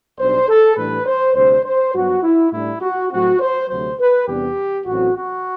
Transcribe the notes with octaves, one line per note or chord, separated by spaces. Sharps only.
B1 B2 G3 D4 C5
A4
A2 E3 G3 D4 B4
C5
D2 C3 G3 D4 C5
C5
G2 F#3 B3 F#4
E4
A2 G3 D4 E4
F#4
A2 F#3 A3 C4 F#4
C5
D2 C3 F#3 C5
B4
E2 C3 G3 B3 D4 G4
A1 A2 F#3 C4 F#4
F#4